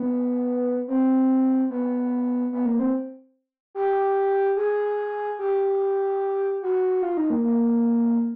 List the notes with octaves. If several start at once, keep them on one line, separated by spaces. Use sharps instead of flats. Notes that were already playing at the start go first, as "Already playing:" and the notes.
Already playing: B3
C4
B3
B3
A#3
C4
G4
G#4
G4
F#4
F4
D#4
A#3
A#3